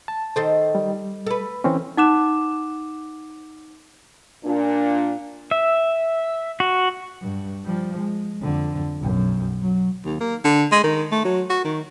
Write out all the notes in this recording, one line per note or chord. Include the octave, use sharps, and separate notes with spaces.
A5
D#3 A4 C5
G3
A4 B4
E3 C4 C#4
D#4 F#5 D6 F#6 E7
A#2 D4
E5
F#4
G2
F3 G3
G#3
F2 D3
B1 F#2
F#3
D#2
A#3
D3
G#3
D#3
A3
F#3
F#4
D#3